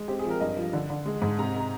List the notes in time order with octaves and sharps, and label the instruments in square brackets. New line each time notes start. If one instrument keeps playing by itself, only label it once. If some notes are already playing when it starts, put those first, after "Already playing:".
Already playing: [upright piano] G#3
C4 G4
G#4
F3
A#4
G2 D#5
F3
D3
D3
G#3
G#2
C3 A#5
C3